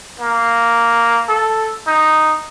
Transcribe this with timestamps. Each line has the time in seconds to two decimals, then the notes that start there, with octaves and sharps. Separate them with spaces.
0.20 A#3
1.29 A4
1.87 D#4